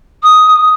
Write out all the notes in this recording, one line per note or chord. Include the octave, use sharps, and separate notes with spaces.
D#6